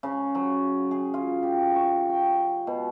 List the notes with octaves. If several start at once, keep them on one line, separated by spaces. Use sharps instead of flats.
C#3
F#3
G#4
F4
G4
C#5
G5
B2